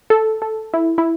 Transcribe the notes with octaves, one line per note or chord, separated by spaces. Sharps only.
A4
A4
E4
E4